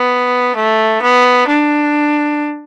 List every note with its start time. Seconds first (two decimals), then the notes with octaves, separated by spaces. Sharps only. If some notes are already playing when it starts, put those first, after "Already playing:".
Already playing: B3
0.56 A3
1.02 B3
1.48 D4